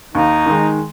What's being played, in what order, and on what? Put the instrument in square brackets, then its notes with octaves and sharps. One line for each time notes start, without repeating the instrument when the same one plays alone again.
[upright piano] D#2 [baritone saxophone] D#4
[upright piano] D#3 G#3